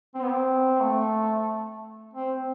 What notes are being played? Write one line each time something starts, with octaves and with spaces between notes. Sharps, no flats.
C4
B3
C4
A3
C4